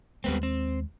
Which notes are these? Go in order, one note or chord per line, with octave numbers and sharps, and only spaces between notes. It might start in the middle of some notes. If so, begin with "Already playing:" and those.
D#2 G3 G#3 B3 C4
C4